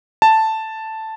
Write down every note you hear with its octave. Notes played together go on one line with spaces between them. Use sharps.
A5